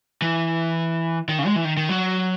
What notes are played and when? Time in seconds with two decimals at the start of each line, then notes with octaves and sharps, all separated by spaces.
0.22 E3
1.29 D#3
1.39 C#3
1.46 G#3
1.56 E3
1.65 D#3
1.77 D#3
1.89 F#3